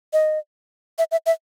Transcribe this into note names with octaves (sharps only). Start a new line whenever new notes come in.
D#5
E5
E5
E5